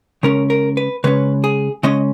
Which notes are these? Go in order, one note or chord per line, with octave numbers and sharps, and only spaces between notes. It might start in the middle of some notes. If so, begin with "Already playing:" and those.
C#3 G#3 C#4 A#4
A#4
B4
C#3 G#3 C#4 B4
G#4
C#3 G#3 C#4 D#5